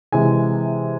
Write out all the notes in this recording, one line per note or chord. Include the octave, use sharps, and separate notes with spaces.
C3 E3 G#3 G#5